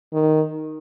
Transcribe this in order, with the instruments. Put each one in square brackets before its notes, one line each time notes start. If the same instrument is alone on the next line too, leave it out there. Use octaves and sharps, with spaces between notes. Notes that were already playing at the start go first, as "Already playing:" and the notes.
[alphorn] D#3